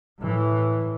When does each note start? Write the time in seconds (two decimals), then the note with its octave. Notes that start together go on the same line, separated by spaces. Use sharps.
0.19 A2 E3